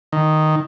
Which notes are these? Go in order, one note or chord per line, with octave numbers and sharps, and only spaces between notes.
D#3